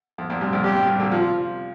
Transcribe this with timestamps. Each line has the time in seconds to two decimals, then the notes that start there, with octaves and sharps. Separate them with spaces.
0.18 F2
0.30 F2 A#2
0.41 G2 C3
0.53 F2 A#2
0.64 G2 G4
0.76 G2 C3
0.87 G2 C3
1.00 A#2 D3
1.11 C3 F3 F4